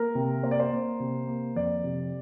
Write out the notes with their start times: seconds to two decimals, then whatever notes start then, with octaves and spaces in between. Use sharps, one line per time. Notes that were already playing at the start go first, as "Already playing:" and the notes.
Already playing: A#3 A#4
0.15 C3
0.43 A#3 C5
0.51 D5
0.60 C5
0.72 A#3
1.00 C3
1.27 A#3
1.56 F2 D5
1.84 C3